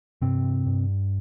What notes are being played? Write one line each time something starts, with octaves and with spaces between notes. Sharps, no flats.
G2 C3 C4
G2